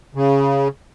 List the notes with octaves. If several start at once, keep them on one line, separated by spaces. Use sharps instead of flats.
C#3